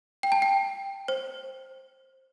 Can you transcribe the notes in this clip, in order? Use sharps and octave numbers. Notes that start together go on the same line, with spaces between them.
G5
A5
G5
C5